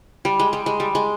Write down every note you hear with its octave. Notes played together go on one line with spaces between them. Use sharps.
G3
G#3
G3
G#3
G3
G#3